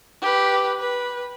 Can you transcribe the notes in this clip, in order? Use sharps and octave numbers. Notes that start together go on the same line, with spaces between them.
G4 B4
B4